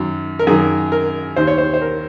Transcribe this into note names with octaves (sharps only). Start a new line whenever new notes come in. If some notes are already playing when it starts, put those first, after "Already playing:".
Already playing: F#2 D#3
A#4
F#2 D#3 G#4
A#4
D#2 D#3 C5
C#5
C5
C5
A#4